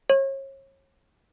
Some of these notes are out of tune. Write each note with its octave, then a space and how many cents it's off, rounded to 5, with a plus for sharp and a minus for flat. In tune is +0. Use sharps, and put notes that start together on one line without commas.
C#5 -35